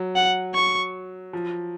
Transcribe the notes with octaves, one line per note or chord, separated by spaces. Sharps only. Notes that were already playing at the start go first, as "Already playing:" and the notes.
Already playing: F#3
F#5
C#6
F3